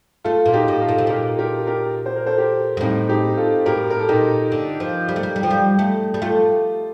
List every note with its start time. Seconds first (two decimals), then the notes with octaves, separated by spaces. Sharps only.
0.24 A3 F4 A4
0.46 A#2 F4
0.53 D#4 G4
0.68 A2
0.82 F4 A4
0.88 A#2
0.98 C3
1.07 A#2 G4 A#4
1.39 G4 A#4
1.67 G4 A#4
2.06 C5
2.16 A#4
2.26 A4 C5
2.38 G4 A#4
2.77 G2
2.81 A2 C4 D#4
3.09 D#4 G4
3.37 F4 A4
3.66 A2 G4 A#4
3.90 A#4
4.00 A4
4.08 A#2 D#4 G4
4.52 D3
4.80 F3
5.09 G3
5.16 A3
5.23 G3
5.36 G3
5.43 F3
5.51 G3
5.79 A3
6.14 G3
6.22 A3 F4 A4